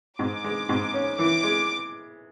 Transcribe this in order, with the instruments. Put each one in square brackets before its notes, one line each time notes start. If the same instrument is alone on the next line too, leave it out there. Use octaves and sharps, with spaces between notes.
[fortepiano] G#2 [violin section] D6
[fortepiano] G#3
G#2
C#4
[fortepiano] E3 [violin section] D6
[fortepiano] G#3